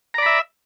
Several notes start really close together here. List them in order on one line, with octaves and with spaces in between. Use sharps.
A#5 D5 B5 E5